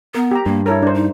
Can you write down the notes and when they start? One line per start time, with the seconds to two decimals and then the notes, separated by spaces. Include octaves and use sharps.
0.15 B3 A#4
0.31 G4 A#5
0.46 G2 A#3
0.66 E4 A4 A#4 C#5
0.82 D4 C5
0.94 D#4